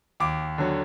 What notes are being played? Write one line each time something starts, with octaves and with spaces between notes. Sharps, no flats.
D#2 D6
D3 F#3